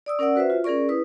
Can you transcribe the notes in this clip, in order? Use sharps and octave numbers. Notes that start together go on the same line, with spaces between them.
D5 D#6 E6
C#4 A#4 D5 F#5 E6
F#4 B4 C5 E5
F4
C#4 G#4 A#4 D5 C#6
E4 B4 D#6